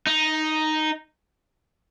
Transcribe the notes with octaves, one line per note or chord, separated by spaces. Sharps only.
D#4